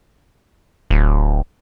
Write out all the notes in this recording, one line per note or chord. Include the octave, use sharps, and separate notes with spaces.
D1